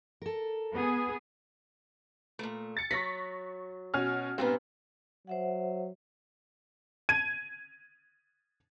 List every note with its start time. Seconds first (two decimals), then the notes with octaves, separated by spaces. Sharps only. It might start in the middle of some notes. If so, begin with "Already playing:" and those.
0.22 A4 A#4
0.73 B3 G#4
2.39 A#2 A3
2.77 A6 C#7
2.91 F#3 C#6 A#6 B6
3.94 B2 C#4 F6
4.38 G2 A#2 B3 C4 C5
5.27 F#3 C5 E5 F#5
7.09 G#6 D#7